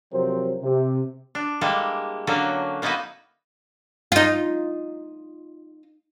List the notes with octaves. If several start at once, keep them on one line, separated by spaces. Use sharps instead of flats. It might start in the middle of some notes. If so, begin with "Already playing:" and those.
C3 F3 F#3 C4 A#4 C5
C3
D4
G3 G#3 A#3 E4 A4
D3 F#3 A#3 C#4 F#4 A4
A#3 B3 D#4 E4 F#4 B4
D#4 F4